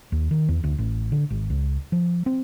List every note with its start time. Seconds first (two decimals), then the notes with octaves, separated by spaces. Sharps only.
0.12 D#2
0.31 D#3
0.49 E2
0.64 D2
0.78 A1
1.12 D3
1.30 G#1
1.50 C#2
1.92 F3
2.26 C4